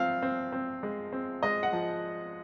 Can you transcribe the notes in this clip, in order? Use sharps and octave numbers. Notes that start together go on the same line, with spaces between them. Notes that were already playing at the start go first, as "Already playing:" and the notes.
Already playing: F3 C4 F5
C4
C4
G#3
C4
G#3 D#5
F#5
F3